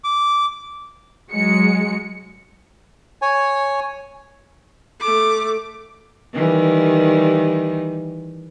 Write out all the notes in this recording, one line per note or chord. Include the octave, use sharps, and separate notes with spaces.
D6
F#3 G#3 C#7
C#5 G#5
A3 D6
D#3 E3 G3